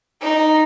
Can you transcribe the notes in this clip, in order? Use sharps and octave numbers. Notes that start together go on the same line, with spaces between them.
D#4